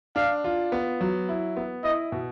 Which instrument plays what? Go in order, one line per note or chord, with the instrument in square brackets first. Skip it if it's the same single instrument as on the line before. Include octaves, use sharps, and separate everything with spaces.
[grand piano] D4 [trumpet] F5
[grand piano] F4
B3
F#3
E4
B3
[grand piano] E4 [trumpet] D#5
[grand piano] B2